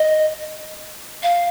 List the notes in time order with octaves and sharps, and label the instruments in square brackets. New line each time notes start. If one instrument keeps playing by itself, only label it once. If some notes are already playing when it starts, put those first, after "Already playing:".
Already playing: [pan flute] D#5
F5